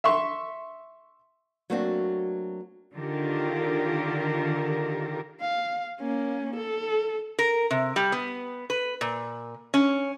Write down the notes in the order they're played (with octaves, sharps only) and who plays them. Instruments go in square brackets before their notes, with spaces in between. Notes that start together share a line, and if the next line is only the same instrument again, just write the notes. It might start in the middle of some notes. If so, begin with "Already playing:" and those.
[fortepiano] E5 C6 C#6
[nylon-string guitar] F#3 A3 A#3 C4 D4 F#4
[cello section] D3 D#3 F4 G4 A4 A#4
[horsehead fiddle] F5
A#3 C#4
A4
[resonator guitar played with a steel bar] A#4
C3
G3
B3
B4
A#2
C#4